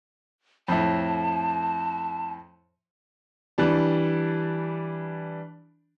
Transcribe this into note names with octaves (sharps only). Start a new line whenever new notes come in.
F2 A2 A5
E3 G3 D4